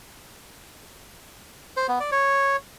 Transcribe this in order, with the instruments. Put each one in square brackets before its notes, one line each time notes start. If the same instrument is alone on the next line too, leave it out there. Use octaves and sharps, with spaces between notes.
[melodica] C5
B3
D5
C#5